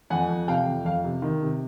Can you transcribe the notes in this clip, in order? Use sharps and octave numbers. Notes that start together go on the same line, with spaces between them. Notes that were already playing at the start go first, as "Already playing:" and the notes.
F2 F#5 G#5
F2
C3 F5 G5
F2
F2 F5
C3
D#3
C3